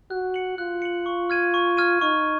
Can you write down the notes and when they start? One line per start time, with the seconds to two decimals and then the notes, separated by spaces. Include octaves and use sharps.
0.10 F#4 F#6
0.34 C#7 F#7
0.58 F4 F#6
0.82 C#7 F#7
1.06 C#6
1.30 F6 G#6 D#7
1.54 C#6
1.77 F6 G#6 D#7
2.01 D#4 C#6